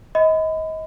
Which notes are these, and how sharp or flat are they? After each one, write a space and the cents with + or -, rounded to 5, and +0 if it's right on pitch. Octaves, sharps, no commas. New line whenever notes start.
D#5 +30 B5 +30